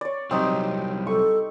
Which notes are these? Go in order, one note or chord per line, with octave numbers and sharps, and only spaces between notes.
C#5 D5
C2 F#3 C4 D#4 G4
A4 C#6